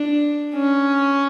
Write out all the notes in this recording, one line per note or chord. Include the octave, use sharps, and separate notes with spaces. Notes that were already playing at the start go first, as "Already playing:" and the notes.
Already playing: D4
C#4